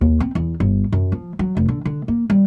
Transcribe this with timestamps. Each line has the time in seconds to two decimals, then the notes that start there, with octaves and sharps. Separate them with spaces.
0.01 D#2
0.20 C4
0.35 E2
0.60 G1
0.92 F#2
1.12 F3
1.39 F#3
1.57 F1
1.69 D3
1.85 D3
2.08 A#3
2.30 G3